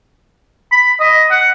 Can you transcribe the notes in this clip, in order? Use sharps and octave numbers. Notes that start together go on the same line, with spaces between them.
B5
D#5
F#5